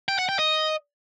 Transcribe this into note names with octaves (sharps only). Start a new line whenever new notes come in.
G5
F#5
G5
D#5